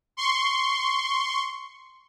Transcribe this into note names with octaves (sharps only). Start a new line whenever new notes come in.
C6 C#6